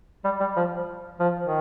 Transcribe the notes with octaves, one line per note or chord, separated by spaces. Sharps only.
G3
G3
F3
F3
D#3